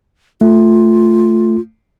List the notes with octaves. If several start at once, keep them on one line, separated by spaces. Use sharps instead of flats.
A3 F4